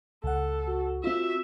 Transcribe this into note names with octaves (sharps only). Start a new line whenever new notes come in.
C#2 A4 F#5
F#4
C4 F4 E5